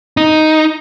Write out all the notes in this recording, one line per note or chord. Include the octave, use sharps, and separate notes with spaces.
D#4